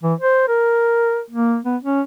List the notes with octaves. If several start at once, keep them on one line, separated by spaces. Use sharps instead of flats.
E3
C5
A#4
A#3
B3
C#4